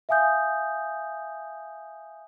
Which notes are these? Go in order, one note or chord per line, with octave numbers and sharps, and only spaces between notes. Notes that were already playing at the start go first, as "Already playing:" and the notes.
E5 F5 G#5 D#6 G6